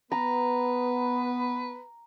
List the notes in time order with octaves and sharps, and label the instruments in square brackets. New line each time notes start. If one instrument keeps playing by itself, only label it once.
[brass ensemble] B3 [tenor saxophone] B4 [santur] A#5